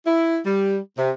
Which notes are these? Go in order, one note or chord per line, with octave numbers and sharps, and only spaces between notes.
E4
G3
C3